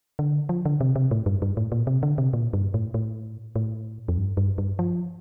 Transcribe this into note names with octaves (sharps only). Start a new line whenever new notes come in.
D3
F3
D3
C3
C3
A2
G2
G2
A2
A#2
C3
D3
C3
A#2
G2
A2
A2
A2
F2
G2
G2
G2
F3